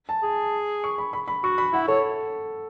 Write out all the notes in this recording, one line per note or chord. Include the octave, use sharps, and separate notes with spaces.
A5
G#4
C#6
B5
B5
B5
F#4 C#6
B5
E4 F#5
A4 C#5